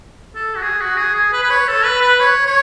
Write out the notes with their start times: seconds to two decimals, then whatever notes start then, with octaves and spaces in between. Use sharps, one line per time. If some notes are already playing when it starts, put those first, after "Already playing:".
0.36 A4
0.56 F#4
0.62 G#4
0.81 F#4
0.97 G#4
1.15 G#4
1.33 B4
1.44 B4
1.51 C#5
1.68 A4
1.85 B4
2.02 B4
2.20 C#5
2.47 C#5